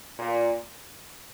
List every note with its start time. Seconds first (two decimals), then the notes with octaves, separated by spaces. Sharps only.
0.19 A#2